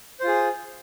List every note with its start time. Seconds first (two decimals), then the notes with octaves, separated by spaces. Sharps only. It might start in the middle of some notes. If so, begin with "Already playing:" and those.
0.20 C5
0.24 F4
0.28 G#4